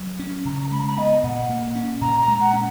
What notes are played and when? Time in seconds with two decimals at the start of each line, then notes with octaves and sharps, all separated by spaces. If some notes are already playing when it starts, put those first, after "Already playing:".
Already playing: F#3
0.19 C#4
0.45 C#3 A#5
0.71 G#3 B5
0.79 A#5
0.88 B5
0.97 B3 D#5
1.23 A#2 F#5
1.49 A#3
1.75 C#4
2.01 A#2 A#5
2.21 A#5
2.27 G#3
2.40 F#5
2.53 C#4